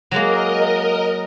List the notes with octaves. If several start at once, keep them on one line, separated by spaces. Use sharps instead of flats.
F#3 G#3 A#3 A#4 D#5